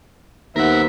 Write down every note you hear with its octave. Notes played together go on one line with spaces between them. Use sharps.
D#2 A#3 B3 A#4 C5 E5 F#5